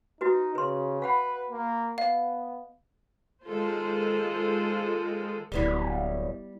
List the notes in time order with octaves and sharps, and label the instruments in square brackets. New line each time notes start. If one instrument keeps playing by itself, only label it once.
[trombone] D#4 [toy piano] E4 F#4 B4
[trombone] C#3 [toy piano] B4 C6
[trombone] B4 [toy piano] F5 F#5 B5
[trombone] A#3
[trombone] B3 [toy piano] D#5 [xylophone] F5
[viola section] D#3 G#3 F4 A4 C5
[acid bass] D1 [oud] G3 B3 E4